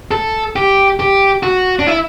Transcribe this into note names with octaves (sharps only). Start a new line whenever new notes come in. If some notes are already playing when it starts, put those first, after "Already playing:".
A4
G4
G4
F#4
D4
E4